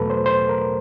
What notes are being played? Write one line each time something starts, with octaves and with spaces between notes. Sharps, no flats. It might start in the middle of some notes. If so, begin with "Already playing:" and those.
Already playing: E2 B2 F#3 A3 A4 B4
C5
C5
A#4